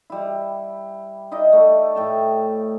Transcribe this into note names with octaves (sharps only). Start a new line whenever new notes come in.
G3 E4
D#4 E4 D5 D#5
A3
A2 G5 A5